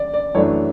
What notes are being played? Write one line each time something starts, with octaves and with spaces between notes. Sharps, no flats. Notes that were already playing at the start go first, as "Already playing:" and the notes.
Already playing: D5
D5
F#2 E3 A3 D4 C#5